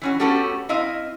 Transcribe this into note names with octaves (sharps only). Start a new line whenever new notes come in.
E3 C#4 F#4
A3 B3 C#4 F#4 G4 A4
C4 E4 D#5 F5